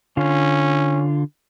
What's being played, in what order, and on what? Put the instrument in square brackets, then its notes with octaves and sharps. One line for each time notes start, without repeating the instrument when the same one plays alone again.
[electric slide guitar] D3 F4 [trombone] C#4